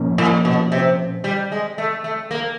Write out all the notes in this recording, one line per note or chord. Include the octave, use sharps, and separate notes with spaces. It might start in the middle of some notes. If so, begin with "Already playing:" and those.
Already playing: A#2 F3 A#3 C#4
A2
B2
C3
G3
G#3
A3
A3
A#3